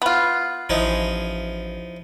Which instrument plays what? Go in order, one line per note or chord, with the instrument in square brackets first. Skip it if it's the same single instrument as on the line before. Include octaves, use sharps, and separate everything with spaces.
[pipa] B3 F4
[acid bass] A1 [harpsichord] F3 D#4 E4